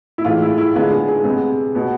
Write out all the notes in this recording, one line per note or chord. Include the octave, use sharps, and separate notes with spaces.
E4
A2 E3 G#3 F4
E4
E4
D3 G#3 B3 F4
G#3 G#4
G#3 G#4
C3 G#3 B3 G#4
B2 B3